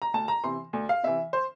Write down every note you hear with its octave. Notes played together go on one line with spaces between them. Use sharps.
A#5
D2 A5
A#5
C3 E3 C6
D2
F5
C3 E3 E5
C5